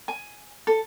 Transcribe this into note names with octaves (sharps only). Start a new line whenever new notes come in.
G#5
A4